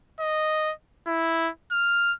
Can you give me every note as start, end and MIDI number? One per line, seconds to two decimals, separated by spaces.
0.20 0.73 75
1.07 1.49 64
1.72 2.13 89